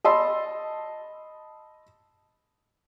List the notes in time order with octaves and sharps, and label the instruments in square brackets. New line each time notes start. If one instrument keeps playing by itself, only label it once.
[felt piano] D#5 A5 B5 C6 E6